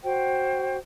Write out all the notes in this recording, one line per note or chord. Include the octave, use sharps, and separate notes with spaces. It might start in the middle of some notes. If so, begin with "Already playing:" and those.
F#4 C5 G5